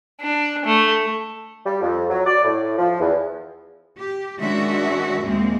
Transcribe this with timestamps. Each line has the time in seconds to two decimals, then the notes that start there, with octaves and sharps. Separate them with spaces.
0.21 D4
0.65 A3
1.65 G3
1.81 F2
2.09 F#3
2.26 D5
2.44 A2
2.78 F3
3.00 E2
3.98 G4
4.40 D#3 G#3 C#4 D4 F#4 E5
5.22 D#2 A#2 G#3 A#3 C4